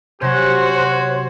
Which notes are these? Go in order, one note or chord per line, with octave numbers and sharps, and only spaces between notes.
C3 F#3 C#4 F#4 C5